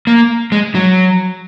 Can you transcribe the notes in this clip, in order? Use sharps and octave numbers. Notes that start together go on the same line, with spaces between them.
A#3
G#3
F#3